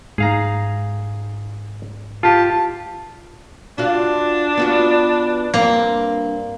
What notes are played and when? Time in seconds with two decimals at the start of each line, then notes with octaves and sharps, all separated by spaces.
0.18 G#2 G#4 F5 A#5
2.23 F4 G4 A5
3.78 D4 F4 F#4 F5
4.57 B3 F4 F#4
5.54 G2 A#3 C4